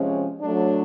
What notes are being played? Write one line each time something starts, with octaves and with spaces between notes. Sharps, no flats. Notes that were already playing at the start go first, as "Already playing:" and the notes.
Already playing: C3 F3 G#3 C#4
F#3 A3 D4